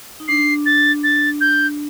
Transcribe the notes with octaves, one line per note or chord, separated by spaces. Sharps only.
D#4
D4 C7
A6
A6
G6